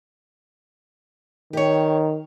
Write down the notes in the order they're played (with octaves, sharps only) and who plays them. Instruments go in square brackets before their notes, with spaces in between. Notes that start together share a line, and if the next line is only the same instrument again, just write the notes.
[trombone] D#3 [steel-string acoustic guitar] G4 C#5